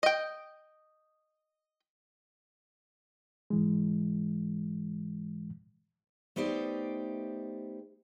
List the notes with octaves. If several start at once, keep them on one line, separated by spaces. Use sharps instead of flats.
D#5 G5
G#2 E3 G#3
A3 B3 D#4 G4 C5 D5